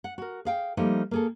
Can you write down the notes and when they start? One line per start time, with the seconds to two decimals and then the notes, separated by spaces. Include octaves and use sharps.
0.04 F#5
0.18 F#4 A#4
0.45 G#4 F5 G5
0.77 F3 G3 A3 A#3 D#4
1.11 A#3 G#4 A4